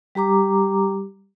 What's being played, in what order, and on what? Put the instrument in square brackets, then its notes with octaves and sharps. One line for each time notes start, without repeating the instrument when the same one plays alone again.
[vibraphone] G3 G4 A#5 D6